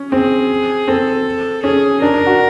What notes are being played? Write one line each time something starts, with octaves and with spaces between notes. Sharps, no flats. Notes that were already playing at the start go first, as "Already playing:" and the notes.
Already playing: C#4
C4 G#4
C4 A4
C#4 G#4
D4 A#4
D4
F#4